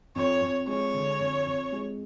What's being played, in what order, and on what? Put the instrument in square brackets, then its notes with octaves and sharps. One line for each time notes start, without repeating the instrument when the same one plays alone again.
[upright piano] F2 [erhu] C#5
[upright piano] F2
[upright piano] G#3 [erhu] C#5
[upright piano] D3
F2
F2
G#3